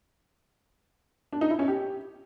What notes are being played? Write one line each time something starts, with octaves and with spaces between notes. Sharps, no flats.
D4
D#4
E4
C#4
G4